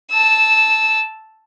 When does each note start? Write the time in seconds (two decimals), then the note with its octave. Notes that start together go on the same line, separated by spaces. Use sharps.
0.11 A5 E6